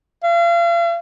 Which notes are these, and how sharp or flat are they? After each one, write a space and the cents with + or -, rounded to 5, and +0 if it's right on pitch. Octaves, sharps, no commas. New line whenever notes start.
F5 -40